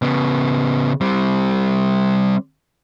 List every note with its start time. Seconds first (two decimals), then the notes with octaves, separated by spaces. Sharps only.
0.02 C#3 B3
1.01 G3 C4